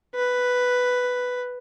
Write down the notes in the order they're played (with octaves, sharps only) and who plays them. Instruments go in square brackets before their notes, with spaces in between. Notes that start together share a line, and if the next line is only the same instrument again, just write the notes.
[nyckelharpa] B4